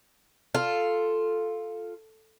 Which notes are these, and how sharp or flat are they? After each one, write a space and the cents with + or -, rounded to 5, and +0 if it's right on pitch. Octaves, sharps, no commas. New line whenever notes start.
F4 +0 A4 +0 F5 +0